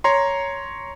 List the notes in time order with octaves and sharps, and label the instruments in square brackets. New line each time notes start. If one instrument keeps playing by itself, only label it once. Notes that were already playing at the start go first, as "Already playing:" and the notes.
[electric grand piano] C#5 A#5 C6